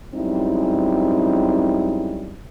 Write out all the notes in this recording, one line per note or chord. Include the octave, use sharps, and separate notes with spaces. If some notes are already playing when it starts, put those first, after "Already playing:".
F#2 G3 G#3 C4 D#4 E4